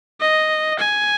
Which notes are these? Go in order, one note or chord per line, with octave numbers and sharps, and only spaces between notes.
D#5
G#5